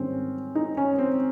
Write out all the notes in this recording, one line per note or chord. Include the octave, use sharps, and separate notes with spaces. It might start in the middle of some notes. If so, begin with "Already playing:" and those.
Already playing: G#2 D#3 G3 C4 C#4
D#4
C#4
C4